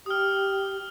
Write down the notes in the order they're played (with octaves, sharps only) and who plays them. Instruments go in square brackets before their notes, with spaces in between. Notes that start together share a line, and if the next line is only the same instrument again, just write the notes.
[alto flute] G4 [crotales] D#6 F6